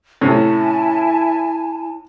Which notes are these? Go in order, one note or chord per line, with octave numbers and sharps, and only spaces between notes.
A2 C3 C#4 E4 G#5 A5